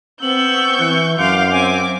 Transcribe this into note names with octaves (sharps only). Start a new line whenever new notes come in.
B3 C4 C#6 E6 G6 F#7
E3 F#6
F#2 F5 C6 D6 G6
C4 E5 G#5 D6